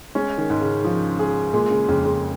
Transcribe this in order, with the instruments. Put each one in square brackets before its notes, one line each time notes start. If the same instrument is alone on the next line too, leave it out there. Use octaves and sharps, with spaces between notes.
[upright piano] G#3 [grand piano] C#4
[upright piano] D#3
[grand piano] G#2
[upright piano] C#3
[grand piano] F3
G#4
[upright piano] A#2 [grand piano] G#3
[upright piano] C#3
[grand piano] F2 [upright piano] C#3
[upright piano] C#3